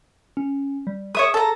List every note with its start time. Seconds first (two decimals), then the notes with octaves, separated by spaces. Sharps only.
0.37 C#4
0.87 G3
1.15 G#4 C#5 E5 D#6
1.34 A4 A#5